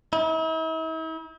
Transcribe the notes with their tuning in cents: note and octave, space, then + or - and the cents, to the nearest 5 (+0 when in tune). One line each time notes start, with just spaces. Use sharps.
E4 -45